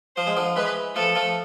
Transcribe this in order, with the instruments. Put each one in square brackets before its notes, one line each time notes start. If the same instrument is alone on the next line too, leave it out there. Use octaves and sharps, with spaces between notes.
[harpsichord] F3 [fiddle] C5
[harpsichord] G#3
D3 F3
[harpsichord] E3 G#3 [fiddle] B4
[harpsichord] F3 A3 [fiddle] A4
[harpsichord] F3 A3